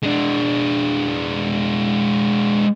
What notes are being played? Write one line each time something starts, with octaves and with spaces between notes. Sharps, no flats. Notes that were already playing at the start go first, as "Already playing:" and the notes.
G#3 D4